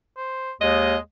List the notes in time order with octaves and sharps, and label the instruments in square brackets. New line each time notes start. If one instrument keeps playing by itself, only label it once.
[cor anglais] C5
[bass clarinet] D#2 [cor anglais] G#3 [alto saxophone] D#5